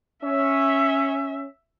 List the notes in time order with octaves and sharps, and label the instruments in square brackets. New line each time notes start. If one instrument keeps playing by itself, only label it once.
[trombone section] C#4 [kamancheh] E5